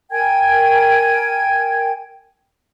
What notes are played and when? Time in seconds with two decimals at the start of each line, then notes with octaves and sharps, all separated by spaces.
0.12 A#4 G5 G#5 G#6